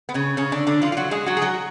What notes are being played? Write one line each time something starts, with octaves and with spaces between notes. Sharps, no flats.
B3
C#3 C#4
C#3 C#4
D3 D4
D3 D4
F3 F4
F4
F#3 F#4
G#3 G#4
F#3 F#4
G#4
F#3 F#4